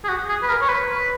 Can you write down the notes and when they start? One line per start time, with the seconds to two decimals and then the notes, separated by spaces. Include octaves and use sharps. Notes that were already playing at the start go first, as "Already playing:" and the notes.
0.05 G#4
0.09 F#4
0.29 G#4
0.43 B4
0.49 A#4
0.62 C#5
0.69 B4